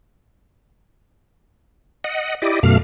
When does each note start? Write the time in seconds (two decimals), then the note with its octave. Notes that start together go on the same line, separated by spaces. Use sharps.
2.04 D#5 F#5
2.42 E4 G4 D5 D#5
2.63 F#2 B2 A3 F5 F6